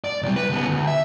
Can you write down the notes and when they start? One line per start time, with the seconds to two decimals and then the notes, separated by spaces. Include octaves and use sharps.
0.04 D5
0.23 C2 G3
0.36 B4
0.49 C#2 B3
0.68 D2
0.87 E5